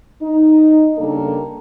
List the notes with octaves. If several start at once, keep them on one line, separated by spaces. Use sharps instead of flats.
D#4
C#3 G3 A#3 D4 A4 A#4